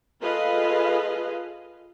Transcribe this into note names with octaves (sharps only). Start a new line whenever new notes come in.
F4 G#4 A4 B4 D#5 F5